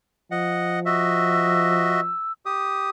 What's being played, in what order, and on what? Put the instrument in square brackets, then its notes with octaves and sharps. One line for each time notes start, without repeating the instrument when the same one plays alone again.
[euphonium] F3 [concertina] D#5 F#5
[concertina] F#4 D#5 E5 [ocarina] E6
[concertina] G4 D#6